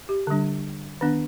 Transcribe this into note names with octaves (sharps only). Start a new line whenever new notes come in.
G4
D3 G3 D4
D#3 B3 D4